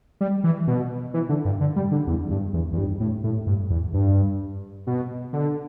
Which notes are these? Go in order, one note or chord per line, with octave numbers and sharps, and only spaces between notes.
G3
E3
B2
E3
D3
G2
D3
G3
D3
E2
G2
E2
E2
G2
A2
A2
G2
E2
G2
B2
D3